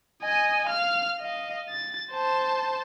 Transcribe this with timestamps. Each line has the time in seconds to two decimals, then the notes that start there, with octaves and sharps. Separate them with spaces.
0.23 D#5 G#5
0.67 F5 F6
1.20 D#5 F5
1.70 A6
2.12 C5 A5